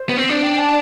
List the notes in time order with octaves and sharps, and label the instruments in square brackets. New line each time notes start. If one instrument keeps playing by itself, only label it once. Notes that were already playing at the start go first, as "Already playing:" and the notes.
Already playing: [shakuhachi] C5
[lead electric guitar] B3
C4
D4
[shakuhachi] G5
A5